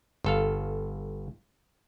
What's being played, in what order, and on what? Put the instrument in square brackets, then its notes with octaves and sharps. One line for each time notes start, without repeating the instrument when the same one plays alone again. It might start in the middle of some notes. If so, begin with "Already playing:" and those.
[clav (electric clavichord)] G1 A4 F5